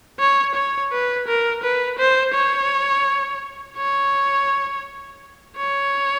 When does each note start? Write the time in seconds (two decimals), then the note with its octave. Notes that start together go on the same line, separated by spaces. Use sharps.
0.20 C#5
0.55 C#5
0.92 B4
1.27 A#4
1.63 B4
1.98 C5
2.34 C#5
3.77 C#5
5.57 C#5